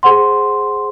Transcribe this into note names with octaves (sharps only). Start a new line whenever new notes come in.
G#4 C5 F#5 C6